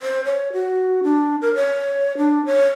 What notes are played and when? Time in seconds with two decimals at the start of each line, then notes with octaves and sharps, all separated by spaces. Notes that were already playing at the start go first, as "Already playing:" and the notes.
0.02 C5
0.25 C#5
0.53 F#4
1.04 D4
1.42 A#4
1.55 C#5
2.18 D4
2.46 C#5